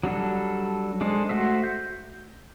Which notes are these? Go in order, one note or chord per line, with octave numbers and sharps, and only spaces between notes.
F#3 G3 D4 A4
G#3 D4 A4 C5
A3 F#4 C5 E5
G6